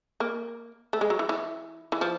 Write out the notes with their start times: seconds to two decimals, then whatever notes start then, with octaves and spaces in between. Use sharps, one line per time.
0.20 A#3
0.93 A3
1.01 G#3
1.10 F#3
1.19 E3
1.29 E3
1.92 E3
2.01 F3